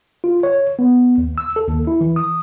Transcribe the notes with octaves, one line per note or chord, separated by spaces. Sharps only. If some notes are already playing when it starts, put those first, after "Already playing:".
F4
C#5
B3
D#2
E6
A4
D#2
E4
E3
D#6